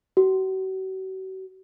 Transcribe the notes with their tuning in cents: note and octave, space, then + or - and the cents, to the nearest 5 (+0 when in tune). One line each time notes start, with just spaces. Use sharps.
F#4 +40